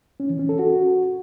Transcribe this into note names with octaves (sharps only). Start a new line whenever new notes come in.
C#4
E3
C#4
A4
F#4